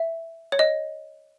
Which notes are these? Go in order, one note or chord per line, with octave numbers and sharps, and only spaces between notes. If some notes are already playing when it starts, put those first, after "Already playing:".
Already playing: E5
C#5
D#5